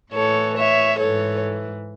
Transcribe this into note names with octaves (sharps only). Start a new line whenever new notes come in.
A2 E3 A4 C#5
C#5 E5
G#2 E3 A4 C#5